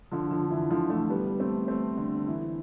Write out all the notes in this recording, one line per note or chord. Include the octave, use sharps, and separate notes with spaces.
D3 F3
D3 F3
E3
D3 F3
F3 A3
G3 B3
A3 C4
A3 C4
D3
E3